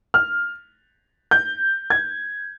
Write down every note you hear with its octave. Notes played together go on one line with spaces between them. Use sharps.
F6
G6
G#6